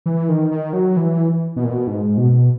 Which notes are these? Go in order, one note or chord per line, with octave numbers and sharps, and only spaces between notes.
E3
D#3
D#3
F#3
E3
B2
A#2
B2
G#2
B2